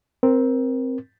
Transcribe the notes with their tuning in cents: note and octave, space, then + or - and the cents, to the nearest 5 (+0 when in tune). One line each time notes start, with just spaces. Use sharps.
C4 +0 A#4 +20